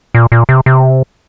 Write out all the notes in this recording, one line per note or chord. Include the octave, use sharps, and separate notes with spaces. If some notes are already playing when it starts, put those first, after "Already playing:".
A#2
A#2
C3
C3